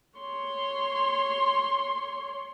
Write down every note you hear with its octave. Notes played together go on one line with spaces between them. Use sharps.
C#5 C6